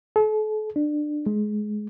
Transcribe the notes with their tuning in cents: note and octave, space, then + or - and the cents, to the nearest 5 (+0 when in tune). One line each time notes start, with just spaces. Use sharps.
A4 -40
D4 +25
G#3 +20